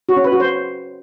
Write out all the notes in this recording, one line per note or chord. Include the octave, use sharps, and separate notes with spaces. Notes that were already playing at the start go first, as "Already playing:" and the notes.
F#4
C#4
B4
F#4
C5